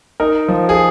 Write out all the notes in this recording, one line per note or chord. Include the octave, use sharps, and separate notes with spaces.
D#4 A#4
F3
G#4